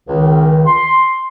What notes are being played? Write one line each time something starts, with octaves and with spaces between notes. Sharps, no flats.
C#2 D#3
C6